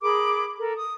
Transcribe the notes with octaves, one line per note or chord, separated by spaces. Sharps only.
G#4 A#4 B5 D6
A4 A#4
D#6